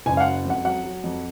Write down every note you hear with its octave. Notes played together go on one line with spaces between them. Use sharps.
F#1 G#5
F5
F#5
F#3
F2
F#5
F#3 F#5
F#3
F2